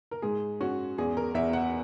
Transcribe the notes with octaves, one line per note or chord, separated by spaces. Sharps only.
A#4
G#2 G#4
C#4 F#4
E2 G#4
A#4
E2 E5
F#5